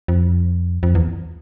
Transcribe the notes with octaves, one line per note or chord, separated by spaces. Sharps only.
F2
F2
E2